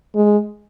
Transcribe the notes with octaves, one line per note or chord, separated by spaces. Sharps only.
G#3